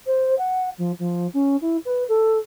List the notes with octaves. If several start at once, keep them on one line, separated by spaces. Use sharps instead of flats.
C5
F#5
F3
F3
C#4
E4
B4
A4